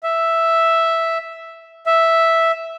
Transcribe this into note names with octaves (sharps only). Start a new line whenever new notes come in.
E5
E5